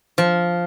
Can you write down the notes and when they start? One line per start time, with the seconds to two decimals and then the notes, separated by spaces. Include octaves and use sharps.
0.18 F3